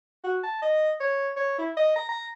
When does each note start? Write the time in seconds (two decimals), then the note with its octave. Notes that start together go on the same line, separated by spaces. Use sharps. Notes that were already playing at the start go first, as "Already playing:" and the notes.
0.24 F#4
0.43 A5
0.62 D#5
1.00 C#5
1.36 C#5
1.59 E4
1.77 D#5
1.96 A#5
2.09 A#5